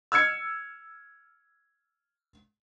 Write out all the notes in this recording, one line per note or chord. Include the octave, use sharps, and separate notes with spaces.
E6 F6 G#6 C#7